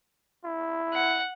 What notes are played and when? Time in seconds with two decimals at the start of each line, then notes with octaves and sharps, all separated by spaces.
0.44 E4
0.93 F#5